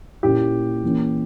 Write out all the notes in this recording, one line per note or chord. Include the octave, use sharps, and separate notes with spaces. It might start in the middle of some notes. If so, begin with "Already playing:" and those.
A#2 A#3 C#4 E4 G4
E3 A#3 C#4